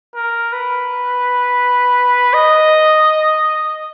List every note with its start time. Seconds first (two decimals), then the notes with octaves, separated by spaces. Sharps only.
0.15 A#4
0.52 B4
2.34 D#5